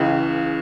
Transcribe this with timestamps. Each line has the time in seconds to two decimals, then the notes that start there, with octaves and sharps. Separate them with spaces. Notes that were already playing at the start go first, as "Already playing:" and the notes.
Already playing: C#2 C#3 E3